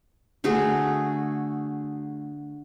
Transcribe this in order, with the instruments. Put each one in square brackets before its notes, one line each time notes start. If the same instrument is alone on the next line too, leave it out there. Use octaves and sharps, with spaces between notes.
[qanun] D3 A3 F#4 G#4